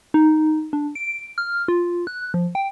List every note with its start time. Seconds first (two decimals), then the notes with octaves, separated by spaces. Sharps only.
0.14 D#4
0.73 D4
0.95 D7
1.38 F6
1.68 F4
2.07 F#6
2.34 F3
2.55 G5